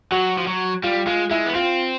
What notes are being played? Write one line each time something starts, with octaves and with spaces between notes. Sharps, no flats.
F#3 F#4
F3
F#3
G3 F4
G#3 F4
G#3 E4
B3
C4 F4